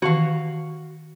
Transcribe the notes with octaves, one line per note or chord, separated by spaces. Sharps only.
D#3 E3 F#4 F5 A5